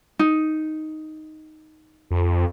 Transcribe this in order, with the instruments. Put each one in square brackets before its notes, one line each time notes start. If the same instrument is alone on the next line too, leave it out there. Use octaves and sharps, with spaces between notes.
[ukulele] D#4
[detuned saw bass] F2